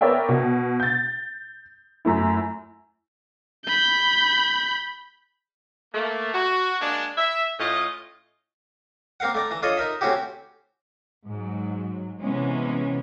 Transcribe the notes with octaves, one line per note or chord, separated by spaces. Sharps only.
B3 A#4 C#5 D5 E5 G5
B2
G6 A6
F#2 A3 E4
B5 G6
A3 A#3
F#4
G#3 A#3 D4
E5
A2 C#4 F4 D#5
A#3 C4 A#4 F5 F#5
A3 D5 A#5
E3 A#5
D4 F4 A4 C#5 D#5
D#4 A#4 E5
A3 C4 C#4 E4 F#4 G4
G#2 F#3
C3 E3 G#3 B3 C#4